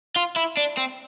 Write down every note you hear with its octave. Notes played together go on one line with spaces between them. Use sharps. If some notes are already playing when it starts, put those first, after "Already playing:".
F4
E4
D4
C4